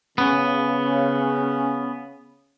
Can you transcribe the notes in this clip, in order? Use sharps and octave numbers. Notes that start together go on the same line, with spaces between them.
C#3 B3 C#4